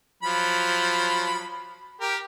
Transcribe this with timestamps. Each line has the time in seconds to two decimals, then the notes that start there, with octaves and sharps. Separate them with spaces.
0.23 F3 F#3 B5
2.01 G4 A#4